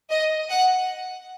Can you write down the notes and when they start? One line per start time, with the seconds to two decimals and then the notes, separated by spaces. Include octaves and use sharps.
0.10 D#5
0.50 F#5